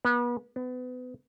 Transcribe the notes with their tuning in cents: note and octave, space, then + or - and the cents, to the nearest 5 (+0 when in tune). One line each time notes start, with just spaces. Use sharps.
B3 -35
B3 +30